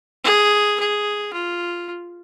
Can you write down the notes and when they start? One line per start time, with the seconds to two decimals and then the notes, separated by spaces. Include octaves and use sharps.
0.24 G#4
0.80 G#4
1.33 F4